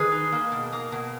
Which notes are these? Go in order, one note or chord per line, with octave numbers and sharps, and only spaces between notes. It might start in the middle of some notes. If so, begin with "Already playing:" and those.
Already playing: D#3 G#4 B4
D#4
A#3
B2
A#3
B2